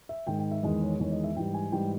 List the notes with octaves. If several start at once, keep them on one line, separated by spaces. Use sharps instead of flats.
E5
G#2 D#3 G#3 G5
G5
E5
E2 D#3 G#3 D#5
C#5
E2 D#3 G#3 C#5
D#5
E5
G#2 E3 G3 G5
G#5
G#2 E3 G3 G5